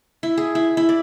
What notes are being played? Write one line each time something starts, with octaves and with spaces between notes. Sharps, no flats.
E4
G#4
E4
E4
D5